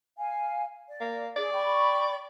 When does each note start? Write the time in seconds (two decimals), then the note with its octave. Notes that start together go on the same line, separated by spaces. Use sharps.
0.17 F5 G#5
0.88 D5
1.01 A#3
1.36 G#4 D5
1.53 G5 B5 C#6